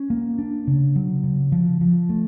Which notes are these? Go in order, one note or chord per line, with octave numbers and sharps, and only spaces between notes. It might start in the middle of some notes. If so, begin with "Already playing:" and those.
Already playing: C#4
A#3
D4
C#3
F#3
C#3
F3
F3
A3